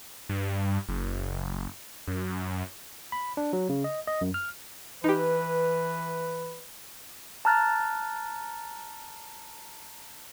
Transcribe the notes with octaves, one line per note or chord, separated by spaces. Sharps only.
G2
F#1
F#2
B5
D4
F#3
C#3
D#5
D#5
F#2
F6
E3 D#4 G4 B4
A5 A#5 F6 F#6 A6